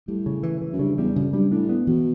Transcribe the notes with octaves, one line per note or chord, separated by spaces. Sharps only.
A2 G3
C#3
E3
E3
F#2
G2 C#3
E2 G3
F#2 C#3
G2 G3
A2 D4
B3
B2 E3